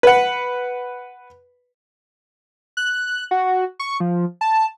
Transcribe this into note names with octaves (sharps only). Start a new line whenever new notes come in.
B4 F#5
F#6
F#4
C#6
F3
A5